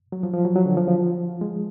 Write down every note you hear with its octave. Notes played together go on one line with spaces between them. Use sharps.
F#3
F3
F3
F#3
F#3
D3
F3
F3
G#3